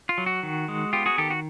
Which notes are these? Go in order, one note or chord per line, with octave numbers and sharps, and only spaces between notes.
F4
F#3
F#4
D#3
G#3
B3 F4 G4
F#4 G#4
D#3 G4 A4
F#4